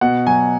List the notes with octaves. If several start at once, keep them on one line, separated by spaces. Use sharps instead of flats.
B2 F#5
F#3 G#5